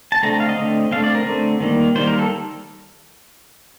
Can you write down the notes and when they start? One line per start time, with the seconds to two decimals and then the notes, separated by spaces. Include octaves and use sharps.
0.12 A5
0.23 D3 A3 C4 A#5
0.40 F5
0.49 D#5
0.57 D3 A3 C4
0.91 D3 A3 C4 F5
1.04 D5
1.15 A#4
1.26 D3 A3 C4
1.60 D#3 G3 A#3
1.95 D#3 G3 A#3 C5
2.07 A#4
2.19 A4